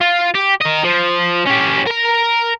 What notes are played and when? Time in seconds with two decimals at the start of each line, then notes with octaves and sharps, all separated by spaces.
0.01 F4
0.35 G4
0.62 A#4 D#5
0.84 F3
1.47 C#4 G4
1.87 A#4 A#5